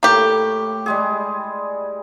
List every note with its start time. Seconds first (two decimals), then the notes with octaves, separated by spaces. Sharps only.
0.03 A2 A#3 G4
0.86 G3 G#3 G#4